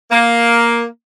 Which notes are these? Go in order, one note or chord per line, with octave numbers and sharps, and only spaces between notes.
A#3